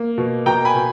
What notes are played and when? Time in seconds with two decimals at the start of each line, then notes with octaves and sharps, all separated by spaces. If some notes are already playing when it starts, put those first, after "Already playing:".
Already playing: A#3
0.18 B2
0.46 B2 G5 A#5
0.65 G#5 B5
0.75 B2